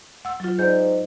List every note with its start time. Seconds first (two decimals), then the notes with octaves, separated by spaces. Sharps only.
0.25 F#5 E6
0.40 F#3 F4
0.59 G#2 D5 G6